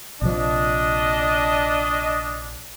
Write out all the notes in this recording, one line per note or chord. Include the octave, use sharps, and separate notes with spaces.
A#1 C3 F3 D4 D#5